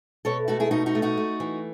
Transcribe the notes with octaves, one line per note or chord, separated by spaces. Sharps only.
B2 A4 C#5
A3 F#4 A4
E4 G#4
B2 D#4 F#4
D#4 F#4
A3
D#4 F#4
A3
E3